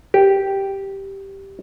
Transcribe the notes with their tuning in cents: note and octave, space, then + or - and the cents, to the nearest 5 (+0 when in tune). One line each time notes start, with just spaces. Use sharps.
G4 -5